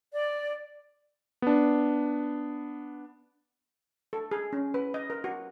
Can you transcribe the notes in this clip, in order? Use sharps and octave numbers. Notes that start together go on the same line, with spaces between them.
D5
B3 D4
A4
G#4
C#4
B4
D#5
A#4
F#4